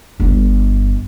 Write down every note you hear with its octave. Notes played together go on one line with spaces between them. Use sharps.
G1 G2